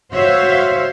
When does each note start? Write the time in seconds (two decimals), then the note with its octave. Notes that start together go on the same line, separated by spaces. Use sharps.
0.12 F#4 C5 C#5 E5 F5